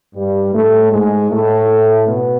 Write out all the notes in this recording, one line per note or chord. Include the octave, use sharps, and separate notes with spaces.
G2 G3
A2 A3
G#2 G#3
A2 A3
B2 B3